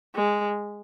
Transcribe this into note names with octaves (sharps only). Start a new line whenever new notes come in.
G#3